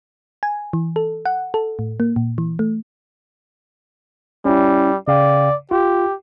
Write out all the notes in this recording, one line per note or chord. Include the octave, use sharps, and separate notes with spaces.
G#5
E3
A4
F#5
A4
A2
A#3
A#2
E3
A3
G3 C#4 E4
C#3 D5 F5 G5
F4 G4